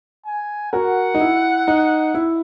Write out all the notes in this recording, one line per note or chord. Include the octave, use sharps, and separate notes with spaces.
G#5
F#4 A#4 F#5
D#4
E4
D#4
E4